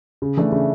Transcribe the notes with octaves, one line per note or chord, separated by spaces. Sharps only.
C#3
E3 A3 D4
C#3